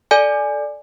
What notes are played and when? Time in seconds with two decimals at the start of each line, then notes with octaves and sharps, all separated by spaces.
0.11 A4 D5 G#5